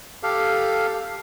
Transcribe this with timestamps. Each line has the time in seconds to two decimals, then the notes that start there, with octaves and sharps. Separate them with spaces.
0.23 G4 A4 F5